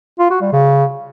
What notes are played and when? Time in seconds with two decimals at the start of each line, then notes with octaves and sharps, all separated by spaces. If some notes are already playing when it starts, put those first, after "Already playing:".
0.19 F4
0.30 F#4
0.41 G3
0.52 C#3